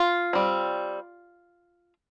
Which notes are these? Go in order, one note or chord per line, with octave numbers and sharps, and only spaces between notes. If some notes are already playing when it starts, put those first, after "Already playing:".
Already playing: F4
G3 C4